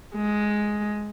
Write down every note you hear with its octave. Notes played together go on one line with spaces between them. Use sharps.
G#3